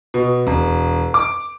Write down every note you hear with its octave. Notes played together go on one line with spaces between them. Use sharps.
B2
E1
D6